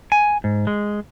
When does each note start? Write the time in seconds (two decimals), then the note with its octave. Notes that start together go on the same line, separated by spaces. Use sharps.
0.12 G#5
0.44 G#2
0.67 G#3